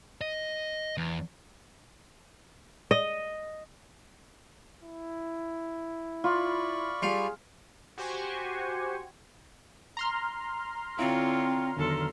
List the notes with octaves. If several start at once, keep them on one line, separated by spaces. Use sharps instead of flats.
D#5
E2
D#5
E4
F4 D5 B5 C#6
G3 F4 G#4 F5
F#4 G4 C5 G#5 C#6
A#5 C6 F6
D3 C4 E4 F4 C#5 F5
E2 D3 D#3 F#3 A4